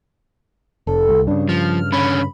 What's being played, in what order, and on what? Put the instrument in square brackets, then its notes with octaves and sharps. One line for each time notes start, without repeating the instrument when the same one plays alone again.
[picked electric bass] F1 [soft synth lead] A4
[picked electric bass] C2
[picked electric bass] G2 C#3 [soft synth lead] D4
[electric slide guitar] F3 [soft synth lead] F6
[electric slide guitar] D3 C#4 [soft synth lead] B5